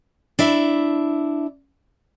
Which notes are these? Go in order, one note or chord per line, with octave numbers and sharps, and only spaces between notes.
D4 E4 E5